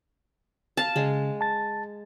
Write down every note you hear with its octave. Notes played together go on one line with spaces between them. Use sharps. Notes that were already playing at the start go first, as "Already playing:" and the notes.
F5 A5
C#3 G#3
A5 A6